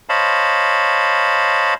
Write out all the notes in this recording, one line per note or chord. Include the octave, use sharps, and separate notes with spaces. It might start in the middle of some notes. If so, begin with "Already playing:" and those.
C5 C#5 D#5 F5 A5 B5